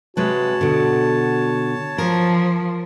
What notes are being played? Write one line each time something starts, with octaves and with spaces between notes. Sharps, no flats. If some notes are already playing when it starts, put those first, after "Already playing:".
C3 G#3 F#4 B4 C#5 A5
B2 D3
F3 A#4